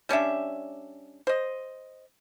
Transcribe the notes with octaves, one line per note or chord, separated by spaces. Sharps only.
G3 C#4 D4 E5
C5 D#5